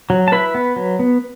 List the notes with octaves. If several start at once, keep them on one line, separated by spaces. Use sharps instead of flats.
F#3
A5
E4 B4 B5
B3
F#3
B3